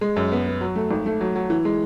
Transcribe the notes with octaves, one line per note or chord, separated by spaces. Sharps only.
G#3
F#2
B3
B3
F#3
A3
G#1
A3
F#3
F#3
E3
G#3